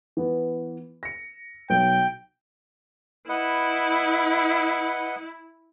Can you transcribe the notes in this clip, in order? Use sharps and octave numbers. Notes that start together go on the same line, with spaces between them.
E3 B3
A#6 C#7
B1 G5
E4 B4 D#5 F#5